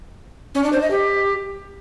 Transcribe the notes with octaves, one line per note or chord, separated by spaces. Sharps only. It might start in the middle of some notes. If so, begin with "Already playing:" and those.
C#4
D4
C5
D#5
G4